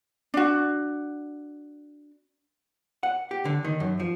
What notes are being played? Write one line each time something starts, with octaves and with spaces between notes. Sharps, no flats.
D4 F#4
F#5
G4
D3
D#3
F#2
F3